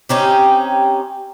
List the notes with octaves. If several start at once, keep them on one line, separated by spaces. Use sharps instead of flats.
C4 C#4 D#4 G4